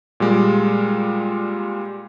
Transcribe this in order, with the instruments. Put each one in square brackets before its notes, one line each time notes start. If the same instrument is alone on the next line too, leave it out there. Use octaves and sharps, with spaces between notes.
[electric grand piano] A#2 G3 G#3